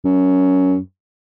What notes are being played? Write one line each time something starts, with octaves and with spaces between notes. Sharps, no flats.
F#2